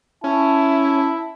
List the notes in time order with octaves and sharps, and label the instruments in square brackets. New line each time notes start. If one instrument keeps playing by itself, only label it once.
[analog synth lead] C#4 [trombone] E4 [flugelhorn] A5